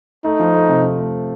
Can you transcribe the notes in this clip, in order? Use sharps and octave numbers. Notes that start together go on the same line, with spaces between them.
A3 D#4
F3
A3
C3
C3
A3